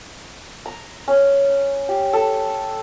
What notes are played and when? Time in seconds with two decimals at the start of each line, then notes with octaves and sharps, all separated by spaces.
0.66 A#5
1.08 C#4
1.89 G4
2.13 A4